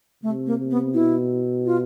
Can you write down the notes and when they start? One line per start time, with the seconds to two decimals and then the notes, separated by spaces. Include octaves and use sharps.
0.23 C3 A3
0.47 A#3
0.59 C3
0.71 B3
0.94 B2 E4
1.66 F4